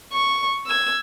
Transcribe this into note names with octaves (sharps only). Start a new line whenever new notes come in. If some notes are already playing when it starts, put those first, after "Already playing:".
C#6
E6 G#6